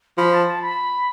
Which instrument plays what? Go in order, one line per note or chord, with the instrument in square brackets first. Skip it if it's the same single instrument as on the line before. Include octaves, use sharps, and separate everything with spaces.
[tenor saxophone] F3 [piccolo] B5
[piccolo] A5
A5
B5